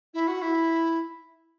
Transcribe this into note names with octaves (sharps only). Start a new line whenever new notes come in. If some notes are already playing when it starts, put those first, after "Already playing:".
E4
F#4
E4